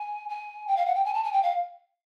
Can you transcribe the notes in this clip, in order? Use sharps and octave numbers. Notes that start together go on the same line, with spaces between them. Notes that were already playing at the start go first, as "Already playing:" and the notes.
Already playing: G#5
G#5
G5
F5
F#5
G5
G#5
A5
G#5
G5
F5